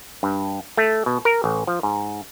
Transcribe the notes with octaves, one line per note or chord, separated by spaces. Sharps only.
G2
A3
B2
A#4
A1
F3
G#2